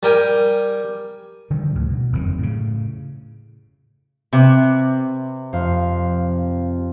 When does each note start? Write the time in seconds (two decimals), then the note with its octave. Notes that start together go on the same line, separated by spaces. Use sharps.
0.03 G3 A#4 G5 G#5
1.50 D3 D#3 F3 G3
1.75 D2 A2 C#3
1.89 B2
2.13 F#1 F2 D#3 F3
2.38 A2 C#3
4.33 C3 B4 D6 F#6
5.53 F2 C5 F5